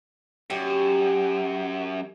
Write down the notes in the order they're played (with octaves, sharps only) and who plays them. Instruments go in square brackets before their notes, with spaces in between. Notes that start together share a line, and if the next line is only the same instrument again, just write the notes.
[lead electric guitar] F#2 [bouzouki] G4